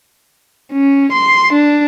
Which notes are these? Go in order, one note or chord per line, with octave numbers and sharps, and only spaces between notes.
C#4
C6
D4